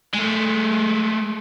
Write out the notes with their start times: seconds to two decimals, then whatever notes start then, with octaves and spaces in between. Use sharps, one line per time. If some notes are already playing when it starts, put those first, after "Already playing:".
0.14 G#3 A3